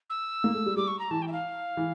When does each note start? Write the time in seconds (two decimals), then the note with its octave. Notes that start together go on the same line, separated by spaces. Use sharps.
0.10 E6
0.44 A#3
0.54 A3
0.66 G3
0.77 G3 D6
0.88 C#6
0.99 A#5
1.11 E3 A5
1.22 G5
1.28 E5
1.32 F5
1.77 E3